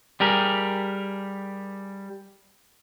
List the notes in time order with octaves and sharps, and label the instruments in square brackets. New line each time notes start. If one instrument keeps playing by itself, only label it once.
[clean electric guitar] G3 G4 G#4 A#4